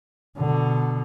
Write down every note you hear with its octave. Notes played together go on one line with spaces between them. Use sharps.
B2 D3